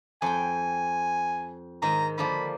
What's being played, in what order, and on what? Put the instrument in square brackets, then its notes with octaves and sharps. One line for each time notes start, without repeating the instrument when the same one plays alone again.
[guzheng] F2 G5 [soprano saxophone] G#5
[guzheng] G#2 D#3 [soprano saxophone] A#5
[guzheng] D3 F3 A#3 [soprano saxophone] B5